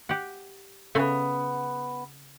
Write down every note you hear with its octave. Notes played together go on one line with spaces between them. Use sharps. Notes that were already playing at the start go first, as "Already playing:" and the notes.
G4 F#5
C#3 A3 B3